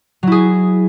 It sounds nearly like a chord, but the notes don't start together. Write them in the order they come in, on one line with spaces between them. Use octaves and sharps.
F#3 E4 G#4